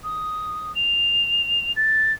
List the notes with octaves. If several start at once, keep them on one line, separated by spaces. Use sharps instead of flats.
D#6
F7
A6